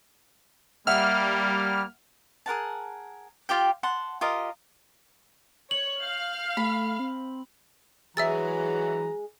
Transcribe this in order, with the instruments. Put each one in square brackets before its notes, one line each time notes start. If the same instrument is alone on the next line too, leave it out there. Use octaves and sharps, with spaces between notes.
[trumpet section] G3 [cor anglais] A#3 [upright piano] E5 F#5 [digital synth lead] F6
[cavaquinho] G#4 A#4 F#5 A5
F4 G4 G5
F#5 A5 C6
F4 G4 A#4 D#5
[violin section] C#5 [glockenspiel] F#7
[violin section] F5 F6 [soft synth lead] G6
[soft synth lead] A3 [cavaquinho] B5
[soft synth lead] C4
[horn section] E3 [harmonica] F#3 A#5 [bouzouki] G#3 G#4 [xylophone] E5 E6 A6